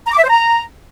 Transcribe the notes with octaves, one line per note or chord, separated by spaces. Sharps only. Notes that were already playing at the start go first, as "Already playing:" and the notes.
A#5
D6
E5
C5
A#5